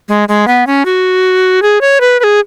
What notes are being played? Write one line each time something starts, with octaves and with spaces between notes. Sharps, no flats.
G#3
G#3
B3
C#4
F#4
G#4
C#5
B4
B4
G#4